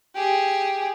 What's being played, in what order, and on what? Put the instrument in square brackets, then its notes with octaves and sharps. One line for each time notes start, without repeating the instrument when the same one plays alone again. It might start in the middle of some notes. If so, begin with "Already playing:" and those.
[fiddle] G4 G#4